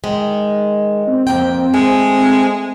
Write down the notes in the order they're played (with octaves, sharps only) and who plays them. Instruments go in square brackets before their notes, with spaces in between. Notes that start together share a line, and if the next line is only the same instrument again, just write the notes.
[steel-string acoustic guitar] D#3 G#3
[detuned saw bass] C4
[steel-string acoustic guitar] F2 A#3 G5
[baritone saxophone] G#3 [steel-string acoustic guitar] A3